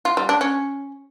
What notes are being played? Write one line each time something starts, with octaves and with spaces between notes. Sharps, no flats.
F4
G3
D4
C#4